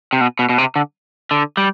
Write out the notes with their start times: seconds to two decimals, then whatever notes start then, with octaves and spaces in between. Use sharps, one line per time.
0.13 C3
0.21 B2
0.39 B2
0.49 B2
0.58 C3
0.76 D3
1.31 D3
1.57 G3